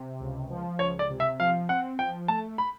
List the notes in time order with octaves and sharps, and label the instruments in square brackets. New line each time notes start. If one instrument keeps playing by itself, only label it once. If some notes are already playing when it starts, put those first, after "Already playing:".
Already playing: [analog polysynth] C3
C#2
F3
[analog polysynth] C#2 [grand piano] C#5
[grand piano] D5
[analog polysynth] C3
[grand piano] E5
[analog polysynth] F3 [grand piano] F5
[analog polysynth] C4 [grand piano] F#5
[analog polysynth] F3 [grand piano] G5
[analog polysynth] A3 [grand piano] A5
[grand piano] B5